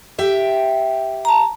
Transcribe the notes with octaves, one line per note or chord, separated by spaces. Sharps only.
G4 E5 G5
A5 A#5